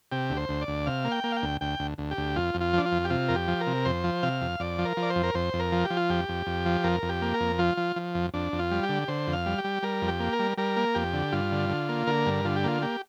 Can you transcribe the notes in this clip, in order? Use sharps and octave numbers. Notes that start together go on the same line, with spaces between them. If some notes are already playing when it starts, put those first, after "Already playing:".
C3 G4
D2
C5
D2
D5
D2
C3 F5
A#3
G5
A#3
F5
G5
D2
D2 G5
D2
D2
G4
D2
F2 F4
F2
F4
F3 D4
F4
F2
G4
C3 F4
F2 A#4
G4
F3
A#4
C3
F2 C5
F3
C3 F5
F2
F2 D5
F3
A#4
F3
D5
C5
F2
A#4
F2 C5
F2
A#4
F3
G4
F3
F4
F2 G4
F2
F2
F3
F2 A#4
F2
G4
A#3
A#4
F2
F3 F4
F3
F3
F2
F2 D4
F2
F4
G3
G4
D3
D3 C5
F2
F5
G3
G4
G3
G3 A#4
F2
G4
A#3
A#4
G3
G3 A#4
A#3
F2 G4
D3
G2 F4
D3
D3
A#3
D3 A#4
G2
D3 F4
G4
A#3 F4
A#3 G4